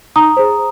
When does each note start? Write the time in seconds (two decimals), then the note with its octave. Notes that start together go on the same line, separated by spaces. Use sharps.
0.16 D#4 A#5 D#6
0.37 G#4 C5